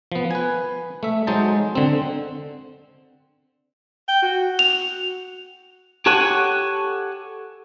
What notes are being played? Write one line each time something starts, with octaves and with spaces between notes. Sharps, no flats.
F3 B3
B4 G#5
A3 E5
F#3 G#3 D#4 C5 A5
D3 C4
G5
F#4
F7
G4 A4 C#5 F#5 G#5